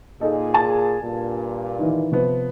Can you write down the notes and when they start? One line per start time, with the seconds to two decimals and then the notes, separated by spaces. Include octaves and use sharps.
0.21 A#2 D#4 G#4 A4
0.54 G#5 A5 A6
1.02 G2 A#2
1.79 D#3 E3
2.12 C3 F3 B3